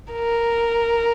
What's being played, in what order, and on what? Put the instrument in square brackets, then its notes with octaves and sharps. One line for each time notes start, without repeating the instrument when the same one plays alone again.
[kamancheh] A#4